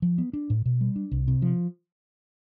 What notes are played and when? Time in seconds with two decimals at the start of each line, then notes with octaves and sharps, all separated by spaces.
0.02 F3
0.18 B3
0.33 D4
0.50 A2
0.66 B2
0.81 G3
0.96 D4
1.11 C2
1.28 C3
1.42 F3